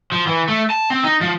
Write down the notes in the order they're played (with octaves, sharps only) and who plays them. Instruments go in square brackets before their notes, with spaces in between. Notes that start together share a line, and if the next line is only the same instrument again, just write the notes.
[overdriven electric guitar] F3
E3
A3
A5
C4
D#4
F3